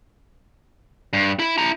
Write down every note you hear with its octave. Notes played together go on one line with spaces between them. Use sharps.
G2
E4 B5
E4 A#5